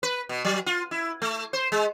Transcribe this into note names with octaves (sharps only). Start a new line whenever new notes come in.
B4
B2
F#3
F4
E4
A3
C5
G#3